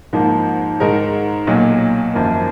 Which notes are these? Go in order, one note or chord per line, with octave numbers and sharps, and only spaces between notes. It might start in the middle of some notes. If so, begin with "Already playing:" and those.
G#2 F3 A#3
G#2 D#3 G#3 D#4 A#4
B1 A#2 F#3
G#1 F#2 F3 A#3